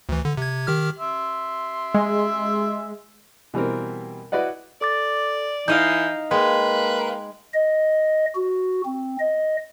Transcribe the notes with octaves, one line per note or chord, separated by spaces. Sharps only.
D2 E3
D3
C3 G#6
D#3 G4 F6
E5 C6
G#3
B2 E3 G3 C4 A#4
E4 F#4 B4 D5 D#5 F#5
A4 D5 D6 A6
E3 D#4 D#5 F5 G6 C7
G#3 A#3 B4 G5
D#5
F#4
C4
D#5